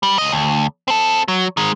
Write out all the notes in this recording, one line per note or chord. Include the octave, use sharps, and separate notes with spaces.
G3
C#2 D#5
D2
C4 A4
F#3
D#3 G#3